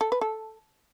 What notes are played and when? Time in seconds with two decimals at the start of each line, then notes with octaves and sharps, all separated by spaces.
0.01 A4
0.12 B4
0.21 A4